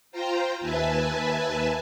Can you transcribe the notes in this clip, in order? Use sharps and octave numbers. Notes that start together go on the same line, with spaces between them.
F4 C5 G5 A#5
D#2 B4 E5 G#5 A5